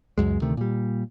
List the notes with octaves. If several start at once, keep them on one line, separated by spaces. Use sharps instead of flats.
C#2 F#2 G#3
D2 C3 D#3 A3
A#2 G3